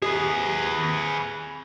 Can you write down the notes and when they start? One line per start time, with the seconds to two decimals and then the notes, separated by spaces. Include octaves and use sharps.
0.02 G4 G#4 B4